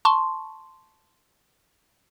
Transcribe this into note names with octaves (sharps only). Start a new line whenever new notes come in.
A5 C6 C#6